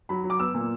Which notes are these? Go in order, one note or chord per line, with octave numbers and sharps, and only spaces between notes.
F#3 B5
F#3
D6
B3 E6
A#2